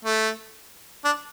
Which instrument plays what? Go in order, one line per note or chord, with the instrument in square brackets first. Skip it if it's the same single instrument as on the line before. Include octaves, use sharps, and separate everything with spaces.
[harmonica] A3
D4